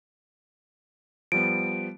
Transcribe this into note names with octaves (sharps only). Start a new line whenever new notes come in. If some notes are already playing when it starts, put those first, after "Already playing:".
F3 G3 B3 D7